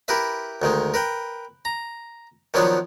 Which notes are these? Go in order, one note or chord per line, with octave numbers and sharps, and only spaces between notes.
E4 G4 A#4 B4 E5
D2 D#3 G#3
A#4 B4 G5
A#5
D#3 F3 F#3 B3 D4 C#5